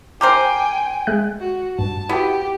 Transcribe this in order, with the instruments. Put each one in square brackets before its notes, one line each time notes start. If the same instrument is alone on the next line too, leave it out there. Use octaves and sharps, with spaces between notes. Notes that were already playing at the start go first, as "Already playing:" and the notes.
[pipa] G4 A#4 C5 [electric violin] G5 G#5
[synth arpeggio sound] G#3 E5 F#6
[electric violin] F#4
[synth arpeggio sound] G2 [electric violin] A5
[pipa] B3 [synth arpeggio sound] E4 F#4 [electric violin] G4